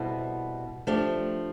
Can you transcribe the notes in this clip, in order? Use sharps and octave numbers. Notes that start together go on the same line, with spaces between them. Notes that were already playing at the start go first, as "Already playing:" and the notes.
Already playing: B2 G3 C4 E4 A4
F3 A3 D4 G4